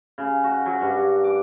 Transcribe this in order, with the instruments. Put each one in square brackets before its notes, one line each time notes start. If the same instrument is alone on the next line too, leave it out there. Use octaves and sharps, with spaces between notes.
[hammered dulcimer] C#3
F#4
F#3
G2
D6